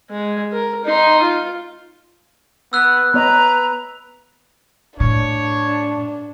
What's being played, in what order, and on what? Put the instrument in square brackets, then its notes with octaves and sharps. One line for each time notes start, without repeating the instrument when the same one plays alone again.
[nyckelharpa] G#3
A#4
D#4 C6
F4
[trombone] B3 [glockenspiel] E6 F#6
[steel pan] B3 C#5 D#5 [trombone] B4 [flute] A#5
[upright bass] A2 [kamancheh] D4 [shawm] C#5